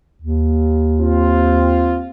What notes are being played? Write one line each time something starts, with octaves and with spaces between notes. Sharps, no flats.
D#2
C4 F4